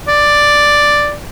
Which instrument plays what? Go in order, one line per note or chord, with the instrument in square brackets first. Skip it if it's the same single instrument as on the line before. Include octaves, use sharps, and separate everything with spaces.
[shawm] D5